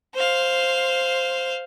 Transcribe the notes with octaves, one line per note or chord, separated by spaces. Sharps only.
C5 F5